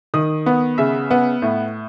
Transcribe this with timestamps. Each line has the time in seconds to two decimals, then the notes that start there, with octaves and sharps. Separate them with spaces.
0.14 D#3 D#6
0.46 B3
0.78 C#3 E5
1.11 B3
1.42 A2